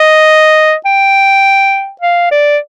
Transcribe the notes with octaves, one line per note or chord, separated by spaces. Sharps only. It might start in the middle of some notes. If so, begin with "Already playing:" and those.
Already playing: D#5
G5
F5
D5